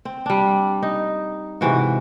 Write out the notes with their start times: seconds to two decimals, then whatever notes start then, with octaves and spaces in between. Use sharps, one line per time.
0.05 C4
0.26 G3 D4
0.82 D#4
1.61 G#2 C3 E3 F#4